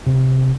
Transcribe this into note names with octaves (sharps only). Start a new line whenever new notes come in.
C3